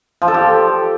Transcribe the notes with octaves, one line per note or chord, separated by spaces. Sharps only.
F3
A4
G4